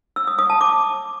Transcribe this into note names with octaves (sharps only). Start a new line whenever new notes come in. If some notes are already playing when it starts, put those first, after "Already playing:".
E6
D#6
D#6
A5
D6